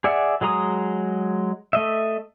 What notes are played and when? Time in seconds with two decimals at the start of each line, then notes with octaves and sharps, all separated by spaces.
0.04 G#4 D5 E5 F#5
0.41 F#3 G#3 G#4 A#5 D#6
1.73 A3 D#5 E5